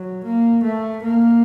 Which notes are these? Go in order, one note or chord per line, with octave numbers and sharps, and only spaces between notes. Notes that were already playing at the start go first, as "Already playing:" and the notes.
Already playing: F#3
A#3
A3
A#3